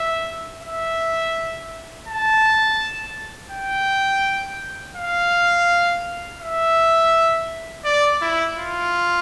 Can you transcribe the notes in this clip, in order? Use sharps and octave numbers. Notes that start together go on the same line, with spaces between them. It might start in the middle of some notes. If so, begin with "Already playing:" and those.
Already playing: E5
E5
A5
G5
F5
E5
D5
E4
F4